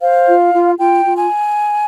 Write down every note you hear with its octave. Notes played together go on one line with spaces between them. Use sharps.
C5 F5
F4
F4
F4 G5
F4
G#5